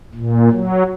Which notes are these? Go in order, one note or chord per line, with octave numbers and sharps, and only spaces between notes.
A#2
F#3